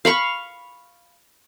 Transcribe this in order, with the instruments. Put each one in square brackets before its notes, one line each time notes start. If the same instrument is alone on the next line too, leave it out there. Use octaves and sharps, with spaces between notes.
[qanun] F5 B5 C#6